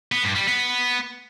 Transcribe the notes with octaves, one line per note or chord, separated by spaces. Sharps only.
B3
G2
G3
B3